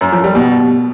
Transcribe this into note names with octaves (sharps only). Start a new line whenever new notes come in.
F#2
F3
G3
B2